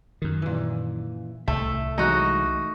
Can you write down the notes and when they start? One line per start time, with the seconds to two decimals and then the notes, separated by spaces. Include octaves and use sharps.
0.22 F#2 D#3
0.42 A#2 E3
1.48 C2 A2 A3 E5
1.98 E3 F#3 G#3 D#4 F#4